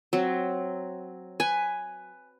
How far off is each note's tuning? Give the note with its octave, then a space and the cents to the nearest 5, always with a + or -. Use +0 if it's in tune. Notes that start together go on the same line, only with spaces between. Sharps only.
F#3 +0 C4 +0
B4 +10 G#5 +0